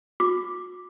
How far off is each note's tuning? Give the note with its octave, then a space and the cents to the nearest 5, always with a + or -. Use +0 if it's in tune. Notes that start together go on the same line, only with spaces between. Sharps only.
F#4 -40 D6 +0